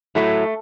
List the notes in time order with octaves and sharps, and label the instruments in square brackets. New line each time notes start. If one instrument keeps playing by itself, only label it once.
[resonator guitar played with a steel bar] A2 F#3 A3